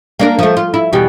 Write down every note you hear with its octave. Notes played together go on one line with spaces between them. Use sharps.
A#3 D4 A#4
F3 A3
F4
E4
E2 B2 G3